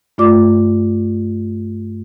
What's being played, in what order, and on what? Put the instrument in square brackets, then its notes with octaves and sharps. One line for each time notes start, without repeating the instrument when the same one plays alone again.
[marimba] G2 A3 F4 D5 D6